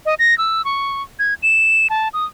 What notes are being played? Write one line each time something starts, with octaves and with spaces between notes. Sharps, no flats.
D#5
A#6
E6
C#6
G#6
E7
A5
D#6